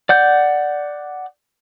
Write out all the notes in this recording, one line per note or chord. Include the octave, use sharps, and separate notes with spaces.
D5 F#5 G6